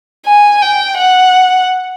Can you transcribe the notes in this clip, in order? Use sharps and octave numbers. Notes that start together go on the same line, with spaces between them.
G#5
G5
F#5